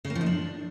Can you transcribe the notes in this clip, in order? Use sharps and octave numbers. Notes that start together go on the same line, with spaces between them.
C#3
A#3
F3
D#4
D4